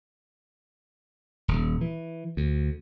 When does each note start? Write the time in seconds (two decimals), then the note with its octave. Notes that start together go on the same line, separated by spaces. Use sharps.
1.48 D#1
1.81 E3
2.37 D2